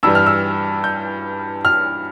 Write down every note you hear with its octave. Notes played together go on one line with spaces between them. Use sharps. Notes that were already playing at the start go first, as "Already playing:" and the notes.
G2 E3 G3 E6
F6
E6
G6
F6